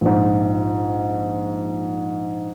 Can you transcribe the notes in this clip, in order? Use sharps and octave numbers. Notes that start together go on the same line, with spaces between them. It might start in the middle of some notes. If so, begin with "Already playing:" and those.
A#1 G#2